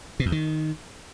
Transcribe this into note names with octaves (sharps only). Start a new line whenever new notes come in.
B2
E2
D#3